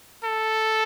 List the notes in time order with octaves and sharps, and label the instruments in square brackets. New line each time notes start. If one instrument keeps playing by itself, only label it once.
[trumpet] A4